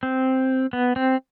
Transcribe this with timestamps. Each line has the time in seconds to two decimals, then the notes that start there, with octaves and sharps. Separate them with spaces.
0.03 C4
0.73 B3
0.96 C4